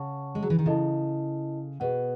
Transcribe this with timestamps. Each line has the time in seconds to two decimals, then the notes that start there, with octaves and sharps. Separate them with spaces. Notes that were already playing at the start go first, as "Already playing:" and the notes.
Already playing: C#3 C#5 F#5 A5 C#6
0.35 G#3
0.42 F#3
0.50 E3
0.59 D#3
0.66 C#3 E4 A4 D#5 A5
1.80 B2 G#4 B4 F#5